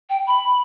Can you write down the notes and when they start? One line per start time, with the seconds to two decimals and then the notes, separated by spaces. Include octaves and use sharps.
0.10 G5
0.27 B5